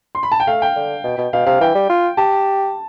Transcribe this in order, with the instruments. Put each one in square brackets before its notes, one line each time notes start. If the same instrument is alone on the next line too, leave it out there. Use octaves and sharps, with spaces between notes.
[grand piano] C6
B5
A5
G5
[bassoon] A3 [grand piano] F5
[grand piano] G5
[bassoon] D3
B2
B2
[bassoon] B2 [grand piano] F5
[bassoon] C3 [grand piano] F5
[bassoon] E3 [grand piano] G5
[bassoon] G3
F4
[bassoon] G4 [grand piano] A5